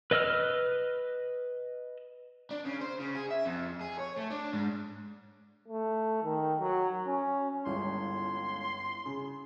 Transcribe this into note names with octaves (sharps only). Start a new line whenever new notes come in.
B4 D#5 E6 F6
D4
C#3
C5
C#3
G#4
E5
F2
G#4
C#5
A3
D4
G#2
A3
D#3
F#3
C#4
G1 C#2 G3 E4 C#5 C6
C#3 G#4